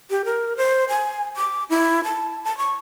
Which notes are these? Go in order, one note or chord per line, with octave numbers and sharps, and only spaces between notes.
G4
A#4
C5
G#5
D6
E4
A5
A5
C#6